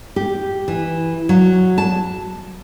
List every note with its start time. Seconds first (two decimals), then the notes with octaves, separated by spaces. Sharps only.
0.16 G4
0.68 E3
1.29 F#3
1.78 A5